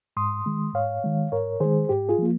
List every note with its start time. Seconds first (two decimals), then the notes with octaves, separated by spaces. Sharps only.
0.17 G#2 C6 D#6
0.46 D#3 G#3
0.74 G#2 C#5 F5
1.04 D#3 G#3
1.32 G#2 A#4 C#5
1.60 D#3 G#3 G#4 C5
1.89 G#2 G4
2.09 F4 G#4
2.18 F3 A#3